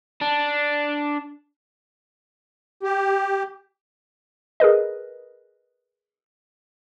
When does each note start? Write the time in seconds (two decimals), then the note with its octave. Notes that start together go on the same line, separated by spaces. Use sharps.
0.21 D4
2.83 G4
4.60 G#4 A#4 B4 D#5